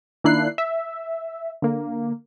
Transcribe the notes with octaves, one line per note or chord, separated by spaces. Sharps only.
D#3 A#3 D4 E4 F#6 C7
E5
D3 A#3